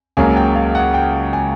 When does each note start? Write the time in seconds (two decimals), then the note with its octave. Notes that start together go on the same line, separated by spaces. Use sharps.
0.17 C#2 C#3 F#3 A#3 G#5
0.36 G5
0.56 F5
0.75 F#5
0.94 G5
1.33 G#5